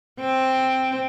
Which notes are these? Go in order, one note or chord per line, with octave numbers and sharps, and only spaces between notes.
C4